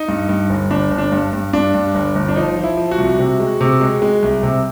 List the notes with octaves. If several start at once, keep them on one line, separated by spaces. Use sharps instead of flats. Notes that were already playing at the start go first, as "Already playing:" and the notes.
Already playing: D#4
G2
G2
G1
G1 D4
G1
D4
G2
G2
G2 D4
G2
G1
G1
D4
F3 D#4
F3
E4
F3
F#4
C2
C3
G#3
C3
G#3
G#3
C2
C3